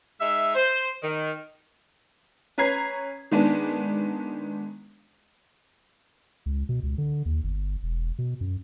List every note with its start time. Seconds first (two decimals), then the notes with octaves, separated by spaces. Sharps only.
0.21 G#3 D#4 E5
0.55 C5
1.03 D#3
2.58 C#4 B4 A#5 G#6 C7
3.31 D#3 G#3 B3 D4
6.46 C#2
6.69 B2
6.83 C#2
6.98 D3
7.26 D#2
7.44 G1
7.83 E1
8.19 B2
8.41 F#2